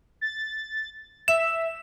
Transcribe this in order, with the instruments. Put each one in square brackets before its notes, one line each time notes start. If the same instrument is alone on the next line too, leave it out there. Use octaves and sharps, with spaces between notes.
[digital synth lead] A6
[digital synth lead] E5 [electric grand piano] E7